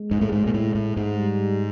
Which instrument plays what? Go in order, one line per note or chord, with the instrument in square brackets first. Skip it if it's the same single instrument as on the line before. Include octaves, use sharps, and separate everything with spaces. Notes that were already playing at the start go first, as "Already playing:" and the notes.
Already playing: [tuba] G#3
[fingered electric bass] G#2
A2
G#2
A#2
A2
A2
G#2
[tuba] G3